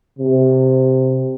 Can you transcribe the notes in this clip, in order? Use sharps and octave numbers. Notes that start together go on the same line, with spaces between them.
C3